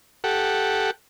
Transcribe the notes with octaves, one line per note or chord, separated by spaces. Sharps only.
G4 A4 F#5